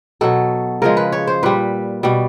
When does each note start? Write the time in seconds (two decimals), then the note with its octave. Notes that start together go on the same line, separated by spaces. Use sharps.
0.21 B2 F#3 A4
0.82 C#3 F3 G#3 A#4
0.97 B4
1.12 C#5
1.27 C5
1.43 A#2 G3 B4
2.03 B2 G3